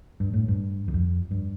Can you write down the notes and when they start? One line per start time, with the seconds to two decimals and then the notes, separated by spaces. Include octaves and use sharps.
0.20 G2
0.33 A2
0.48 G2
0.88 E2
0.94 F2
1.31 G2